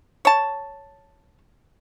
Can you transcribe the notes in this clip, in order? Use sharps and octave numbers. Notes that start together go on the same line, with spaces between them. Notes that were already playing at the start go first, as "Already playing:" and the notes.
C#5 A5